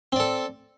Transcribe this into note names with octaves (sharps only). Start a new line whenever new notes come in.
C4 A4 D5